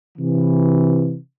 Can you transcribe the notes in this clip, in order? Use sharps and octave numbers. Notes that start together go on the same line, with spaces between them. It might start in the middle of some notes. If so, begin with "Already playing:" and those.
C3 E3